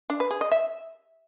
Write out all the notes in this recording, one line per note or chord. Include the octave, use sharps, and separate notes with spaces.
D4
B4
G#4
D#5
E5